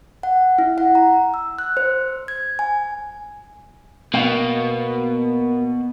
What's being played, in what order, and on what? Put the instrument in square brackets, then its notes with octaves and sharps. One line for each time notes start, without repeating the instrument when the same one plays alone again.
[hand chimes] F#5
E4
F#5
A#5
E6
F#6
C5
G#6
G#5
[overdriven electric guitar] B2 [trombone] A#3 [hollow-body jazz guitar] B3 F5 G5